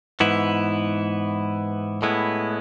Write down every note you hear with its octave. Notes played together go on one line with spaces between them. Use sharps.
G#2 E3 B3 E4
A2 G#3 B3 E4